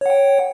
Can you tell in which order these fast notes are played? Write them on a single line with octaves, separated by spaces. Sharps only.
C#5 F#5 G5